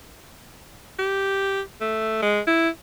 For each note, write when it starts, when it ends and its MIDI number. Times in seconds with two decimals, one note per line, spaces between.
0.99 1.61 67
1.81 2.19 57
2.22 2.41 56
2.47 2.69 64